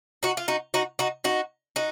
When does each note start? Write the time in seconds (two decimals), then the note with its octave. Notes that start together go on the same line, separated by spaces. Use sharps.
0.23 D#4 F#4
0.37 F4
0.48 D#4 F#4
0.74 D#4 F#4
0.99 D#4 F#4
1.24 D#4 F#4
1.76 D#4 F#4